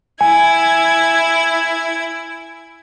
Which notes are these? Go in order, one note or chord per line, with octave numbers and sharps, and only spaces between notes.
E4 G#5 G#6